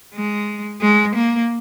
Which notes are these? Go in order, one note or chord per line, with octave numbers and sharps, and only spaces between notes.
G#3
G#3
A#3